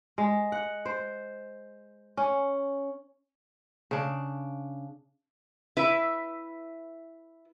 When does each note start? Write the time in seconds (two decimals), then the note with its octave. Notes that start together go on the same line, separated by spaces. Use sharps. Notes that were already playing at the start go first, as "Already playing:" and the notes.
0.18 G#3
0.52 F#5
0.85 C5
2.17 C#4
3.91 C#3 D4
5.77 E4 B4 E5